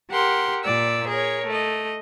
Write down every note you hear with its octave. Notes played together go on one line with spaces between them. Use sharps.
G4 A#4 F#5 C6
A#2 D5 E6
G#4 A#4 C#5
A3 D#5